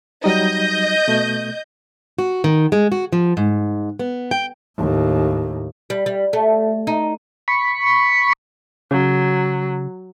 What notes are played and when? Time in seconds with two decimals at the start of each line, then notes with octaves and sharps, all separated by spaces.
0.24 F#3 G3 D#4 D#5 G6
1.08 B2 A3
2.19 F#4
2.44 D#3
2.72 G#3
2.92 F#4
3.12 F3
3.37 G#2
3.99 B3
4.31 G5
4.77 D#2 A2
5.90 G3
6.06 G3
6.33 A3
6.87 D#4
7.48 B5 C#6
8.91 C#3 F#3